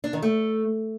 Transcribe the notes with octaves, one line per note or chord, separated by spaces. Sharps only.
D4
D#3
A3